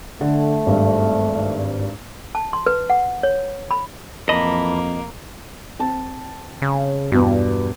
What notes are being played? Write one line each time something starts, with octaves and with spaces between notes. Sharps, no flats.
D3 A3
G#1 G2
A5
C6
B4
F#5
C#5
B5
F2 E3 A#3 D#5 A5 B5
C4 A5
C#3
E2 G2 B2